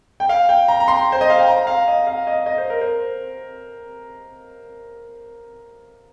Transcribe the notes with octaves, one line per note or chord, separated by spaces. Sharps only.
G5
F5
G5
A#5
A#5
C6
C5
D#5
F5
G5
A#5
F5
D#5
F5
D#5
D#5
C5
A#4
C5